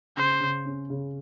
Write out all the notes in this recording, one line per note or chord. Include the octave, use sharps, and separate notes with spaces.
C#3 C5
C#3
C#4
C#3